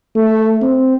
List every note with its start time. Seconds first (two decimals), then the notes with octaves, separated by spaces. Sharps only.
0.15 A3
0.62 C4